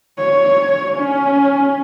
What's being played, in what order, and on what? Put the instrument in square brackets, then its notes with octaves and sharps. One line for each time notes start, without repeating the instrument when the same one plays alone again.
[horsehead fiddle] C#5
C#4